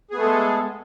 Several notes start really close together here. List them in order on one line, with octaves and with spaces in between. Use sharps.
G#4 B3 A3 A4 G#3